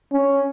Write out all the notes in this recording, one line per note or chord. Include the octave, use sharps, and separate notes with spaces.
C#4